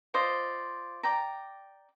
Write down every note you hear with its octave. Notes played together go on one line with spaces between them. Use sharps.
F4 C5 D5 D#5
D5 G5 A#5